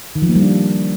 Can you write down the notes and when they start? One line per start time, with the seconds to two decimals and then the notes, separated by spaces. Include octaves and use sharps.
0.16 D#3
0.22 F3
0.29 A#3
0.36 G3
0.42 D4